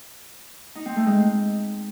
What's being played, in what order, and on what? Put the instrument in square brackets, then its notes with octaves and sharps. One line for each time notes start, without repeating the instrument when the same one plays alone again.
[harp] D#4
C4
A3
G#3